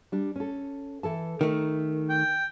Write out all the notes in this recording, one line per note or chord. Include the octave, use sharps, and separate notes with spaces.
G3 D4
C#4 A4
E3 A4 A5
D#3 A3 A#4
G5